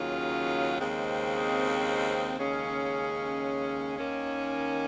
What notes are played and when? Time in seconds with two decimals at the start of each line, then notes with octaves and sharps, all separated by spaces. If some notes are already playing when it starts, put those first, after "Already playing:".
Already playing: D#2 C#3 F#3 C#4 F4
0.80 D#2 C#3 G#3 C4
2.39 D#2 C#3 G#3 C#4
3.98 D#2 D#3 A#3 C#4